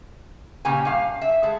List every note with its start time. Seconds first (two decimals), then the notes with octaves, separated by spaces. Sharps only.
0.65 A#2 C#3 C#4 G4 G#5
0.85 G2 F5
1.21 E5
1.43 G#3 A3